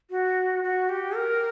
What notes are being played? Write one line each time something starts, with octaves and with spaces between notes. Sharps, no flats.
F#4
F#4
G4
A#4